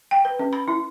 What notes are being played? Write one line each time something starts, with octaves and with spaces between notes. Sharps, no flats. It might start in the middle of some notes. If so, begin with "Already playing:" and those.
G5
B4
C#4
B5
E4